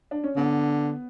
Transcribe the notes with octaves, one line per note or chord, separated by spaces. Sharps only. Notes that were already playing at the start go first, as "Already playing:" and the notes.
D4
C#4
D3 B3